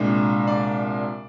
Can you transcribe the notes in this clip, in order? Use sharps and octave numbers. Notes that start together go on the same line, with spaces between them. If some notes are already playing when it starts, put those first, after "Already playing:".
Already playing: C2 A#2 G#3 D4
D5